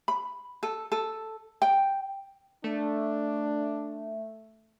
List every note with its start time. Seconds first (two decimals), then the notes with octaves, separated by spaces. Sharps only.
0.08 B5
0.63 A4
0.92 A4
1.62 G5
2.64 A3 D4